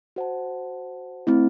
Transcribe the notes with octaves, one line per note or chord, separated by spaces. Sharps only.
F#4 C5 F#5 A5
A3 C4 E4